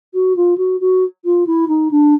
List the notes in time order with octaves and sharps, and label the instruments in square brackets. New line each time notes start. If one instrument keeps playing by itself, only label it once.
[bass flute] F#4
F4
F#4
F#4
F4
E4
D#4
D4